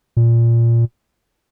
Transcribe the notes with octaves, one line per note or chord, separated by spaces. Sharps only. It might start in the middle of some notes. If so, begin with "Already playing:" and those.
A#2